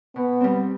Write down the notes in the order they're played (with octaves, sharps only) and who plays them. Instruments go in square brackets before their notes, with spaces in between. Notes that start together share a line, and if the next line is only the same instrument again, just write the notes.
[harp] B2 [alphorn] B3
[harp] G3 C4